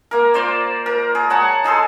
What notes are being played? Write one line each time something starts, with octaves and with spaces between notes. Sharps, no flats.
A#3 A#4
F4 C5 D5
A#4
G#4
C#5 F#5 A5 A#5
D#4 G#4 A4 C6